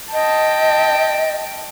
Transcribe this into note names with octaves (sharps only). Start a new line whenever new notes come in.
D#5 G5 A5